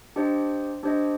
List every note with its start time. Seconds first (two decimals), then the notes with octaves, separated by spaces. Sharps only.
0.16 D4 G4 C5 D#5
0.83 D4 G4 C5 D#5